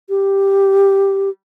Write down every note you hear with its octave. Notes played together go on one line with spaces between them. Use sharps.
G4